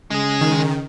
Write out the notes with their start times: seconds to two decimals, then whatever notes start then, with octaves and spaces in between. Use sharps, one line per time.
0.11 C#3 G#3 G#4
0.41 D#3